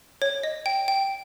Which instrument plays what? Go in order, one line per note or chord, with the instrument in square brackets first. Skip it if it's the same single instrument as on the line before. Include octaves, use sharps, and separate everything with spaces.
[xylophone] C#5
D#5
G5
G5